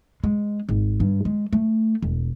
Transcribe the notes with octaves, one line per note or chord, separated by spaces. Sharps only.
G#3
G#1
G2
G#3
A3
E1